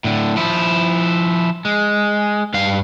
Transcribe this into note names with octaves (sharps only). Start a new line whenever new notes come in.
A2 D3
F3 E4
G#3
G2 F5